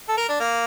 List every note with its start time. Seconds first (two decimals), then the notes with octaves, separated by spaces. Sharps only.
0.09 A4
0.17 A#4
0.29 D4
0.40 A#3